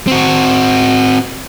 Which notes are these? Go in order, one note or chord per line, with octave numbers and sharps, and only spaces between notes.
C4 F#4